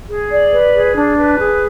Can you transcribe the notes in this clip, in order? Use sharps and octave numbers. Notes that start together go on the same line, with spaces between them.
G#4
D5
B4
G#4
D4
B4
G#4